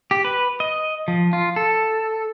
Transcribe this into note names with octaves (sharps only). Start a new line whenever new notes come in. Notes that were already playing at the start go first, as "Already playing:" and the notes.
G4
B4
D#5
F3
F4
A4